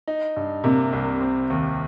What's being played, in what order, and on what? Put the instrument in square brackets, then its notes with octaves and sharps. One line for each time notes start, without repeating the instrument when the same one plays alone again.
[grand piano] D#4
G2
[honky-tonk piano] C3 [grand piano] A#3
[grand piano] C2
C4
D#2